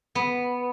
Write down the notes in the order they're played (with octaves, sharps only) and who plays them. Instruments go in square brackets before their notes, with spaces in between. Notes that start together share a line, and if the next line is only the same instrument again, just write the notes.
[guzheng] B3